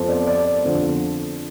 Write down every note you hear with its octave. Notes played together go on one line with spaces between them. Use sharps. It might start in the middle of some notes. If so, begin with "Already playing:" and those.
Already playing: F2 F3
D5
D5
F2 D3 F3